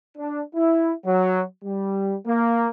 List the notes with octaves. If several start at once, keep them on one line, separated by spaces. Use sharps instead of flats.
D4
E4
F#3
G3
A#3